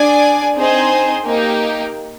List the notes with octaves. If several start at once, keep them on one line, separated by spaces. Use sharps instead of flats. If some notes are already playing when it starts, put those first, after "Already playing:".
Already playing: D4 G#4 D5 G#5
C4 D#4 G#4 C5
A#3 D#4 G4